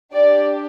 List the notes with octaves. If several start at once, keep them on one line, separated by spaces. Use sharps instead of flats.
D4 G4 D5